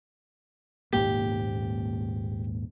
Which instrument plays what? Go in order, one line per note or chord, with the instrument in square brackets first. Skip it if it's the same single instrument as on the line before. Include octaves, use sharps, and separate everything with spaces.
[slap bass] D#1 G#2 A#3 [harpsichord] G4